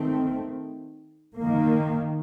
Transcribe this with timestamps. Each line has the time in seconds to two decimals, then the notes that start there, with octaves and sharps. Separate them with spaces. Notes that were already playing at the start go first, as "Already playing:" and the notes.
Already playing: D#3 A3 C4
1.38 D#3 A#3